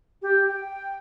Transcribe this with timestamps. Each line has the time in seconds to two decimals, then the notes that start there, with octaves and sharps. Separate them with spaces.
0.22 G4
0.48 G5